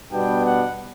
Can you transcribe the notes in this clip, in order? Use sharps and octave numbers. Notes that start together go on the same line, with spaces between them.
B2 G3 B3 D4 G5
F#5